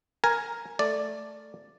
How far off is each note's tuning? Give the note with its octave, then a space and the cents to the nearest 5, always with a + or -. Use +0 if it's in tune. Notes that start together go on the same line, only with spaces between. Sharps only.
A#4 +0 G#5 +0
A3 +0 D5 +0